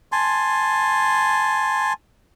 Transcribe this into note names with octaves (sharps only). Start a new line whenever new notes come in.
G#5 A5 C6